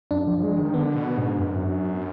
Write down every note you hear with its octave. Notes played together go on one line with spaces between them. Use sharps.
F#2 D4
F3
G#3
D#3
D3 B3
B2
G#2
F#2